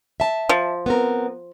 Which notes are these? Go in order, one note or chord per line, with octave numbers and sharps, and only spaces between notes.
E5 A5
F3
B3 C4 A#4